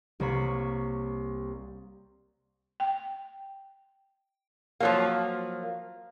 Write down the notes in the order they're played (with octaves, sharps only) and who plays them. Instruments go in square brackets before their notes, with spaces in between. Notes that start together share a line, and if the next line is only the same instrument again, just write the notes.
[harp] C2 A#3 C#5 B5
[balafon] G5
[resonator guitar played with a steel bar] F3 F#3 A#3